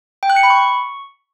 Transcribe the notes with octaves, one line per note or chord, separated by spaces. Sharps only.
G5
F#6
C#7
B5
C#6